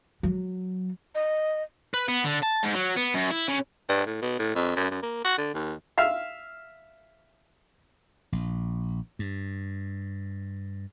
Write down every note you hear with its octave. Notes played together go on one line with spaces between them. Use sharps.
F#3
D#5
B4
B3
D3
A5
G#2
F#3
B3
F#2
E4
C#3
G2
A2
B2
A2
F2
F#2
F#2
A#3
F#4
D3
D#2
E5 F5 F6
A#1
G2